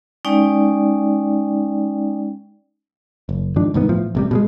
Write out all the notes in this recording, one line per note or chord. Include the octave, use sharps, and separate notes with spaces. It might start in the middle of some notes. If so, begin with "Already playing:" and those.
G#3 C#4 D#4 D5 G5
F#1
G#2 D#3 F3 D4
C2 G#2 D#3 B3
A2 F3
A1 C3 G3
B2 G3 G#3